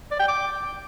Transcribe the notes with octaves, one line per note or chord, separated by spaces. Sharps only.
D5
G5
D6